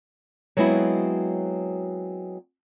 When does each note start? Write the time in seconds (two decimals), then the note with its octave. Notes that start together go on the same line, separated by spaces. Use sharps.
0.57 F#3 G#3 B3 C4 E4 F#4